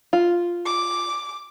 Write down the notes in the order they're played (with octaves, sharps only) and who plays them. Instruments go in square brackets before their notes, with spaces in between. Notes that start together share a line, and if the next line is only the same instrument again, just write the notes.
[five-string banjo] F4
[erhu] D6